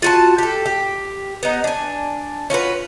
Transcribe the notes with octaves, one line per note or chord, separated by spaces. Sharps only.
F4 F#4 A5
G4 A4
G4
B3 D#4
D4 G#5
C#4 F4 F#4 B4